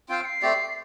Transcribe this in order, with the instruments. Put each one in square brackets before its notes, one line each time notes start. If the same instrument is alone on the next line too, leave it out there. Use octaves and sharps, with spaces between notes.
[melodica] C4 F4 C5 F5 [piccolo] D7
[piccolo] C7
[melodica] A3 C4 G4 D5